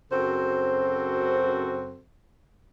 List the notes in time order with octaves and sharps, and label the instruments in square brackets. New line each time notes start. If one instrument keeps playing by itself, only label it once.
[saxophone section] F#2 C#3 C4 F#4 A4 C5